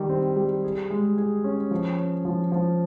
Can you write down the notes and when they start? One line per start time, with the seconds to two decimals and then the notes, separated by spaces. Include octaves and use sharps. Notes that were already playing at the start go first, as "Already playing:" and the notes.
Already playing: D#3 G3
0.09 C4
0.36 G3
0.64 G#4
0.90 G#3
1.18 G#4
1.44 C#4
1.71 F3
1.98 C#4
2.25 F3
2.52 F3